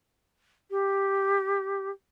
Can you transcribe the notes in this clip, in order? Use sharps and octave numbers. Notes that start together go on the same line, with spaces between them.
G4